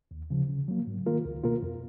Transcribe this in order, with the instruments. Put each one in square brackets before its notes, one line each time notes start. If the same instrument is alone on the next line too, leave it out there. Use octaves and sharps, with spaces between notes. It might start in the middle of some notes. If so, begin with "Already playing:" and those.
[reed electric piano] D#2
C#3 F3
C#3
F#3 A#3
G#2
D#3 A#3 F4 A#4
C#2
B2 A#3 F4 A#4
F2